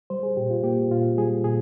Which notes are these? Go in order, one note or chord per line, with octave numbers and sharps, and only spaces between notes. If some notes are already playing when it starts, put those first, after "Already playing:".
G3 C5
G#4
A#2 G4
F4
A#3 G4
A#2 F4
G3 G#4
A#2 G#4